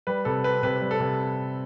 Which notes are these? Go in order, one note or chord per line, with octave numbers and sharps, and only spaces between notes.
G3 B4
C3 A4
C4 B4
C3 B4
G3
A4
C3